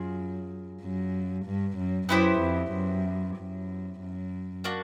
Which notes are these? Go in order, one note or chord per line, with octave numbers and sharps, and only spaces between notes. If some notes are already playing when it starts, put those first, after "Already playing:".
Already playing: F#2 F4 G#4
F#2
G2
F#2
F#2 B3 E4 G4 C5
F2
F#2
F#2
F#2
A#3 D4 F#4